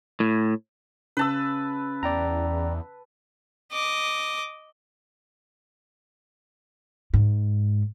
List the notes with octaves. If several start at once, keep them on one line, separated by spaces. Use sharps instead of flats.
A2
C#3 B4 A5 E6
E2 D5 G5 A#5
D#5 D6
G#2